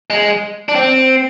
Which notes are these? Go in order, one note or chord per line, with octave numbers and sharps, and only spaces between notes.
G#3
D4
C4